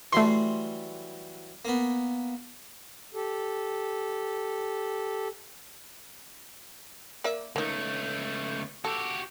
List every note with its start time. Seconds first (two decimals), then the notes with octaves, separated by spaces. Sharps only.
0.13 E3 F#3 G3 A3 C6
1.65 A#3 B3
3.14 G4 A4
7.24 A#3 D5 E5
7.56 C#2 A3 A#3 D#4
8.85 F#4 G4 A4